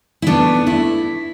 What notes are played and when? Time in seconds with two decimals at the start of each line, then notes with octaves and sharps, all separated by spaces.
0.22 E4
0.27 B2 A3 B3 D4
0.66 A3 E4